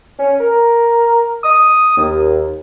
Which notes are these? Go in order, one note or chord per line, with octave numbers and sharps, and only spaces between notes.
C#4
A#4
D#6
D#2